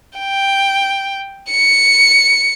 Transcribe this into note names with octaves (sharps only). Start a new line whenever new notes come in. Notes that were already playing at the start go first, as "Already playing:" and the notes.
G5
C#7